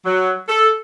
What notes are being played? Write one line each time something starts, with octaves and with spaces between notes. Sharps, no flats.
F#3
A4